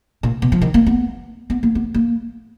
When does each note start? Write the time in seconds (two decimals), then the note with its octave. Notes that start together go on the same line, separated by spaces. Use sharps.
0.23 A#2
0.42 B2
0.52 F3
0.62 D#3
0.74 A#3
0.86 B3
1.50 B3
1.63 A#3
1.75 B3
1.94 A#3